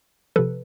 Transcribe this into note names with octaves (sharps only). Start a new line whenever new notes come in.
C3 F3 A4 B4